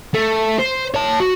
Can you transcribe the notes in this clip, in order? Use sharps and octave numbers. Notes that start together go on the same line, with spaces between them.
A3
C5
C#5 A5
F#4